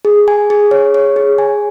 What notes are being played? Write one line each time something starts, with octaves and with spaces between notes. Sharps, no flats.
G#4
G#5
G#4
C#5
C#5
G#4
G#5